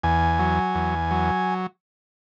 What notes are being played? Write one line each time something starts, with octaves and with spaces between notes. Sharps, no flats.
E2 G#5
F#3
E2
F#3